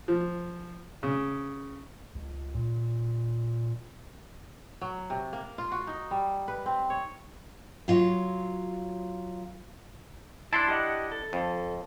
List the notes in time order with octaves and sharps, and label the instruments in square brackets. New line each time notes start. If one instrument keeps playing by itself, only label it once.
[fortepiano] F3
C#3
[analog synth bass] C#2
A#2
[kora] F#3
C3
A#3
F4
F#4
D#4
G3
B4
C4
C#5
[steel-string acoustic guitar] F#3 F4 C#5
[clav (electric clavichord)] D4 E4 [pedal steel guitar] A5 C6
[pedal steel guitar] G4 D#5 F#5
A4
[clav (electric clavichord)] F2